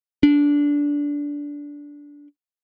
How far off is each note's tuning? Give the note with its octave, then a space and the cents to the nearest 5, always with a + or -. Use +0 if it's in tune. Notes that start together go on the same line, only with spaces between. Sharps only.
D4 -15